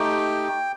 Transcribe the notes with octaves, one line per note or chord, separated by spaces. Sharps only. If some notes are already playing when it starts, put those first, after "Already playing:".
Already playing: A3 D#4 G4 G5